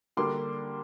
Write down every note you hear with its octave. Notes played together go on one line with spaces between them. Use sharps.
D3 G3 A#3 D4 C6 D6